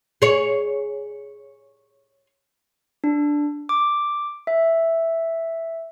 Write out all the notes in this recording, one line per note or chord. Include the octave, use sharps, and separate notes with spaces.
G#4 C#5
D4
D6
E5